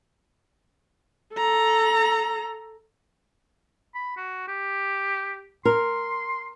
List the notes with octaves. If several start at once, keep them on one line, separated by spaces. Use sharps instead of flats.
A4 A#5
B5
F#4
G4
A#4 C6